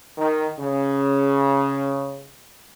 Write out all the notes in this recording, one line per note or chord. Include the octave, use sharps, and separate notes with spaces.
D#3
C#3